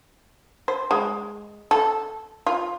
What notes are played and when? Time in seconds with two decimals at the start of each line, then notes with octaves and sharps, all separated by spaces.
0.68 C5
0.91 G#3
1.71 A4
2.47 F4